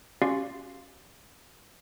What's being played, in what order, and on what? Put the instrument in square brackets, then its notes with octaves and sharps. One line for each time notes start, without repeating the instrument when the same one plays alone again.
[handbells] C#4 F#4 G4 D5 F5 C6